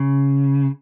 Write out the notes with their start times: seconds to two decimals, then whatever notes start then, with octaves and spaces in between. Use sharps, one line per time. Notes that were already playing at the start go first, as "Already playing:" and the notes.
Already playing: C#3